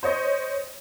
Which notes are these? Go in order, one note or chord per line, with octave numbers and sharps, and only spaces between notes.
C5 C#5 D#5